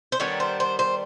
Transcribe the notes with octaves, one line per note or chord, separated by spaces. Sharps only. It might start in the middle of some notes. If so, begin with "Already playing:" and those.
C5
D#3 G3 B3 D4 C#5
C5
C5
C5